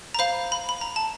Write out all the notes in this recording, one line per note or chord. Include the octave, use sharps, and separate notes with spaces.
A#5
C5 F5 B5
B5
B5
A#5
A5